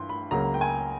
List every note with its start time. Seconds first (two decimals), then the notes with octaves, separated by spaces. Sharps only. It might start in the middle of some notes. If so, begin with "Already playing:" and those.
Already playing: G2 E3 C6
0.09 B5
0.31 C#2 C#3 F#3 A#3 A#5
0.54 G5
0.61 G#5